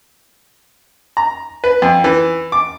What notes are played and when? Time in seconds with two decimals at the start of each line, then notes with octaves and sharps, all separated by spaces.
1.17 A#5
1.64 B4
1.82 F2
2.04 E3
2.52 D6